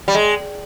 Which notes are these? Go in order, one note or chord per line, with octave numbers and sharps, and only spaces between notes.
G3
G#3